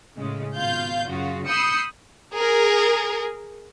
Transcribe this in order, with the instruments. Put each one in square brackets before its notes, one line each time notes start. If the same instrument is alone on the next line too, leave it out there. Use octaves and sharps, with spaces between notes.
[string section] A2 C#3 G#3
G#1 B2 F4 F5 G6
F#2 C#3 F4 F#4
B5 D#6 E6 G6 C7 C#7
[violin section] G#4 A#4